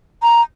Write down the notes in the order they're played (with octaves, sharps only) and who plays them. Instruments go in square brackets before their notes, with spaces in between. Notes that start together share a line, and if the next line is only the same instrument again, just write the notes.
[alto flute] A#5